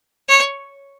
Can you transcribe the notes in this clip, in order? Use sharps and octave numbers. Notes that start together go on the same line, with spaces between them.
C#5